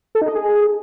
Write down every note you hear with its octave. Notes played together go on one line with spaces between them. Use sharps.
A4
D#4
D#5
G#4